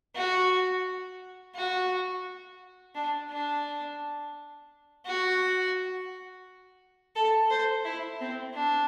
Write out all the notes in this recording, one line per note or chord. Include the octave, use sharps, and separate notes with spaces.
F#4
F#4
D4
D4
F#4
A4
C5
E4
C4
D4